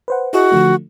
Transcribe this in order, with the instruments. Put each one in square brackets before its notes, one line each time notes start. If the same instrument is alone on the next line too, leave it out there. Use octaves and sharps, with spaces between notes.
[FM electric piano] B4 C5 F#5
[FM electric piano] E4 G#4 D#5 [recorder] F#4
[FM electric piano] D3 F3 A3